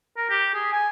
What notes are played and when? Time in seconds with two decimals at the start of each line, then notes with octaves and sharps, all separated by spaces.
0.17 A#4
0.30 G4
0.54 G#4
0.72 G#5